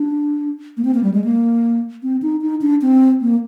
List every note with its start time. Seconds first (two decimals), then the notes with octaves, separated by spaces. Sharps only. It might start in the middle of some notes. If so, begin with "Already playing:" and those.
Already playing: D4
0.77 A#3
0.85 C4
0.94 A#3
1.03 G3
1.14 G#3
1.24 A#3
2.03 C4
2.22 D#4
2.42 D#4
2.61 D4
2.82 C4
3.21 A#3